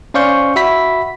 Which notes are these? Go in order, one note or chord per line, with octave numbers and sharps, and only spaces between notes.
C#4 C5 D5 F5 C#6 G6
F#4 E5 B5 B6